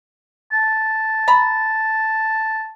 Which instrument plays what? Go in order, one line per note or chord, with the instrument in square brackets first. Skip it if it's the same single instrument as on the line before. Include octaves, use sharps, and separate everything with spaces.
[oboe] A5
[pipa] A#5 B5